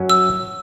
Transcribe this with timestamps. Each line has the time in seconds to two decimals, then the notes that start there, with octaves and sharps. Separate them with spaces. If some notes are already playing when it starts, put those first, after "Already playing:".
Already playing: F#2 F#3 C#4
0.10 E6